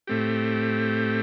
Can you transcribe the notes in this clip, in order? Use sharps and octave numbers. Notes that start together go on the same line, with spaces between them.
A2 A3 C4 G4